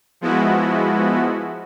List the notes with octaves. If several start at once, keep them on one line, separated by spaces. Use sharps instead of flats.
F3 G#3 B3 E4 F#4